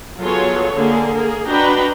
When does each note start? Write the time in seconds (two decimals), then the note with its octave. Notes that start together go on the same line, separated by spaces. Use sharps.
0.19 F#3 B3 F4 G#4 A4 C#5
0.74 D3 A#3 G#4
1.12 A#3 G#4
1.48 D4 F#4 B4 D#5 G5 A#5